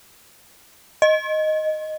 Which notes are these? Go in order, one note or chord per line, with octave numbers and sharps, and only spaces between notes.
D#5